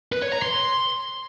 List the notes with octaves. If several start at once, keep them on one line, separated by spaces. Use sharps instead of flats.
B4
C#5
A#5
C6